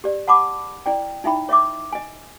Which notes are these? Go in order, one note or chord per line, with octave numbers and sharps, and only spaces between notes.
G4 D5
F#5 A5 B5 D6
E4 D5 G5
D#4 E4 E5 G5 B5
C#5 D#5 E5 D6
D#5 G#5